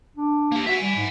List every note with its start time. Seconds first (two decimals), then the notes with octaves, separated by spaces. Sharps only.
0.17 D4
0.52 A#3 G4
0.67 F#4 E5 G#5
0.82 G3
0.96 G#2